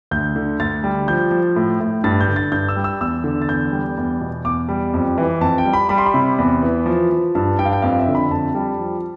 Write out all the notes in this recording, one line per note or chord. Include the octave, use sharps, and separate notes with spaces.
D2 G6
D3
D2 A6
G3
F3 G6
F3
A2
A2
G2 A6
G6
D3
A6
G2 G6
E6
G3
E6
E2 E6
D3
A6
E2 G6
G3
E2
B2
E2 D6
G3
F2
E3
F2 A5
G5
G3
B5
G3 B5
C6
B5
C3
E2
E3
F3
F3
G2 A5
G2 G5
F5
G5
F2 F5
E5
D3
B5
F2 A5
G3
F3